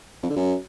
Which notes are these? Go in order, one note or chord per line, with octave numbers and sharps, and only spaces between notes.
F2
D3
F#2